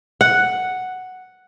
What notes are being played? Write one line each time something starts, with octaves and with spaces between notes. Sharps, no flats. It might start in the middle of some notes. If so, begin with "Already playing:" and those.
F#5